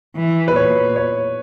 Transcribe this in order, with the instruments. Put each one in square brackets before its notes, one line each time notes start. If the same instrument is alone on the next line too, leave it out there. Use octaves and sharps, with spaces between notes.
[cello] E3
[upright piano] B4
[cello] A#2 [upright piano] C#5
[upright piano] C#5